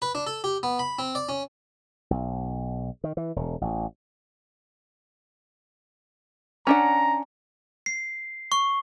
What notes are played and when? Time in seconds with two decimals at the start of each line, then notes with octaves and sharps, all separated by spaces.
0.02 B4
0.15 D4
0.27 A4
0.44 G4
0.63 B3
0.79 B5
0.99 C4
1.15 D5
1.29 C#4
2.11 B1
3.04 D#3
3.17 E3
3.36 E1
3.61 A1
6.67 C#4 D4 F#5 A#5
7.86 C7
8.52 C#6